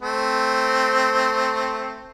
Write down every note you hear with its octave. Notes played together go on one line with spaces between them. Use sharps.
A3 C4